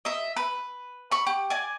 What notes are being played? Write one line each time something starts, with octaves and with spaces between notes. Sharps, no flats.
D#5 E5
B4
B5 C#6
G4
D5 G#5